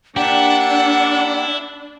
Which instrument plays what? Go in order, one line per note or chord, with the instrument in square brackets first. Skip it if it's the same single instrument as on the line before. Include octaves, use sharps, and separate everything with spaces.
[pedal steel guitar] A#3 G4 [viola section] D4 [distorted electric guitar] E4 [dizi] F#5